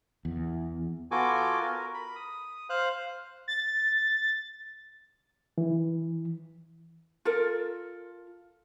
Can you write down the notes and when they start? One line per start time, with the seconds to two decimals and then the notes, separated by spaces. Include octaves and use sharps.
0.25 E2
1.11 B3 F4 F#4 A4 G#5 D6
1.60 A#4
1.94 B5
2.16 D#6
2.70 C5 F5 F#6
3.48 A6
5.58 E3
7.25 F4 A4 A#4